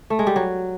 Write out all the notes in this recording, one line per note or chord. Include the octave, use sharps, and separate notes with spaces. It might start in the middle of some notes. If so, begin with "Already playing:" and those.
A3
G#3
G3
F#3